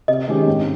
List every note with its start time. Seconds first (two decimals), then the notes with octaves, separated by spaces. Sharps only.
0.08 C3 D#5
0.28 D#3 G#3 C#4 G4
0.48 G#2